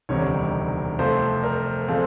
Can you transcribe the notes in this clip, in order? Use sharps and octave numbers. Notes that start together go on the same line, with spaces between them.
E1 D2 C3 D#3 G3 C#5
F2 C3 F3 A3 C5
A#4
A#2 F3 G#3 C4 A4